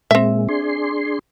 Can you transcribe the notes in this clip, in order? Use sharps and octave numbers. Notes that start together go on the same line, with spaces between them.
A#2 G#3 C4 E5
D4 G#4 C6